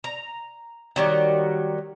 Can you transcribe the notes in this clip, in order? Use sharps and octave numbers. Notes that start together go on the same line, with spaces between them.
A#5
D#3 F#3 G3